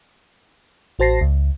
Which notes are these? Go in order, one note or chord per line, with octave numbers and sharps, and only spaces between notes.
A1 F#4 C5 A5 A#6 C7
C#2